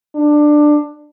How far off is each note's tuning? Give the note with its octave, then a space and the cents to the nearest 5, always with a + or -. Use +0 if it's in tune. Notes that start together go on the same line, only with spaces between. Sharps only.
D4 +15